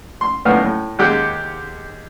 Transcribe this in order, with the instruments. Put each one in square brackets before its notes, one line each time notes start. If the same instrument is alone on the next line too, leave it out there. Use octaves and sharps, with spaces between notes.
[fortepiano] C6
D2 A2 A#3 B3 F6
A2
D#2 G#3 G4 F#5